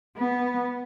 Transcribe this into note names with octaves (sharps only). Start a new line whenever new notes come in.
B3